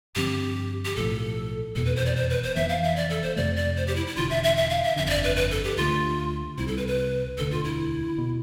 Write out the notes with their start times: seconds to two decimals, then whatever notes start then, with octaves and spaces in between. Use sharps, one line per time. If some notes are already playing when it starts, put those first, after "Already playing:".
0.15 G2 D3 F3 C4 G4
0.85 G4
0.96 B1 A2 F3 A4
1.75 F1 E2 B2 B3 A4
1.85 B4
1.96 C5
2.06 D5
2.16 C5
2.30 B4
2.43 C5
2.56 F1 F2 E3 B3 E5
2.69 F5
2.84 E5
2.96 D5
3.10 A4
3.22 C5
3.36 F2 C3 F3 A3 D5
3.56 D5
3.77 C5
3.87 G4
3.96 E4
4.07 E4
4.16 E1 E2 D3 F4
4.30 E5
4.44 E5
4.57 E5
4.70 F5
4.84 E5
4.96 G1 F2 D3 E5
5.07 E5
5.10 D5
5.24 B4
5.36 B4
5.51 A4
5.64 G4
5.77 D2 D3 A3 F4
6.58 C2 C3 G3 E4
6.67 A4
6.77 B4
6.87 B4
7.38 E1 D2 D3 A4
7.51 F4
7.64 E4
8.18 B2